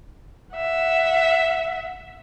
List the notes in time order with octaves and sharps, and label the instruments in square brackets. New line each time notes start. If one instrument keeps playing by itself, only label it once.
[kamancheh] E5 F#5